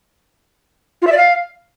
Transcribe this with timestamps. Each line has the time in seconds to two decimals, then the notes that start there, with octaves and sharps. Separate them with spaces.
1.02 F4
1.07 E5
1.12 D5
1.17 F5